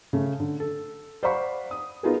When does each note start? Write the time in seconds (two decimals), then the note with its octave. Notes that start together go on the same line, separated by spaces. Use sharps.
0.13 C#3 A3
0.40 D3
0.60 A4
1.23 C5 D5 F5 F#5 B5 C#6
1.71 D#6
2.03 B3 D#4 F4 F#4 G#4 A#4